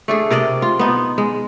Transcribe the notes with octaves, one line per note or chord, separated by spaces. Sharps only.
A3 D4 G#4
C3 A#4 D5 D#5
F4
B3 D#4
G#3